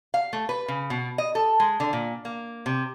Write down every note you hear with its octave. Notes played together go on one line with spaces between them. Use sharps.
F5
A3
B4
C#3
B2
D#5
A4
G#3
D3
A#2
A#3
C3